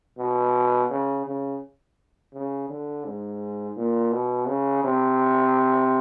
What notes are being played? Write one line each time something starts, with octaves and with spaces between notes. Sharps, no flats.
B2
C#3
C#3
C#3
D3
G#2
A#2
B2
C#3
C3